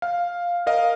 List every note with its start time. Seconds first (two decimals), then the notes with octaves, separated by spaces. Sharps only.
0.02 F5
0.67 A#4 D#5 F5